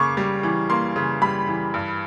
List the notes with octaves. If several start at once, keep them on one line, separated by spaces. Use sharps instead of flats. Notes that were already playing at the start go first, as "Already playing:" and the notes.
Already playing: C#3 A#3 C#6 D6
G3
E3
A#3 C6
C#3
G3 B5
E3
G2